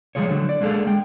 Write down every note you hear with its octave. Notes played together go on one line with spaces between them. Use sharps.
F3 G3 G#3 F4 C#5
D3 F#3 A3
D5
G#3 A#3 D4 G#4 A4 F5
G#3 G5